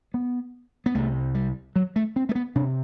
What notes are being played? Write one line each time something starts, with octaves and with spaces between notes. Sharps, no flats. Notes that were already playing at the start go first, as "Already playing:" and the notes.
B3
B3
C2 C3 A3
G3
F#3
A3
C4
A3
B3
C3 D4